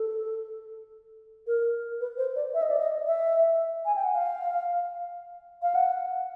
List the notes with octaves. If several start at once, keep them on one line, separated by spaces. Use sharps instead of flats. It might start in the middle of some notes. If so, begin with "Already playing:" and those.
Already playing: A4
A#4
B4
C5
D5
E5
D#5
D5
D#5
E5
G#5
G5
F#5
F5
F5
F#5